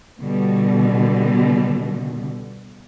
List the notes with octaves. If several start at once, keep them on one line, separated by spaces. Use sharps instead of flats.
B2 D3 G3